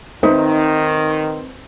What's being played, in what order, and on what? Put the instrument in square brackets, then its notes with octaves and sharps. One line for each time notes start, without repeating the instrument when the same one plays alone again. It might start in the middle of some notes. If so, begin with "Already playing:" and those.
[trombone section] D#3 [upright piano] C4 B4 C5 [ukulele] D#4 E5